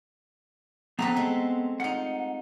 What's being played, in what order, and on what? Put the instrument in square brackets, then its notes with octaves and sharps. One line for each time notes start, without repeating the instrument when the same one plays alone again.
[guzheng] A3 C4 B4 [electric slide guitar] B3 A#5
[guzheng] G#3 A3
[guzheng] D#4 F4 [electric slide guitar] F#5